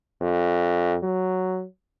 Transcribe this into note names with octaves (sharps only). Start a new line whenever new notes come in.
F2
F#3